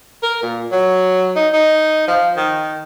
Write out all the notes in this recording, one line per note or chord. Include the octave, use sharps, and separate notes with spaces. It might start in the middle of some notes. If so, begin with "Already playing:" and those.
A#4
A#2
F#3
D#4
D#4
F3
D#3